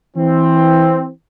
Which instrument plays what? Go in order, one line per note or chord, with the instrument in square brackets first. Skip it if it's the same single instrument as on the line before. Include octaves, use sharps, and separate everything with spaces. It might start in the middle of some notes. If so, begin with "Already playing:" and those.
[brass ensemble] E3 C4